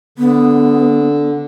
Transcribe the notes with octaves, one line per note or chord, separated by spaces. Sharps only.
D3 B3